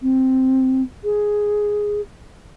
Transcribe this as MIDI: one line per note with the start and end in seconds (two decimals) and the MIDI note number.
0.02 0.82 60
1.04 2.01 68